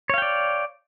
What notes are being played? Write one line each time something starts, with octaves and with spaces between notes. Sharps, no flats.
C#5 D5 F5 G5